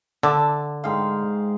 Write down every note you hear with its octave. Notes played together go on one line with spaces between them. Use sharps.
D3 E5 A5 D6
G#2 G#4 F5 G5